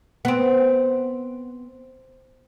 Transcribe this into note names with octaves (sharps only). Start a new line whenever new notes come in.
B3 C4